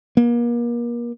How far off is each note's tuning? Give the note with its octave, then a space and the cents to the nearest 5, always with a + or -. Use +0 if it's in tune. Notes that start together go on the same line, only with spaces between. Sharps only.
A#3 +35